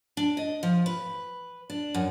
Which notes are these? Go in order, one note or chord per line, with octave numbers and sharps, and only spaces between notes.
D4
D#5
F3
B4
D4
F#2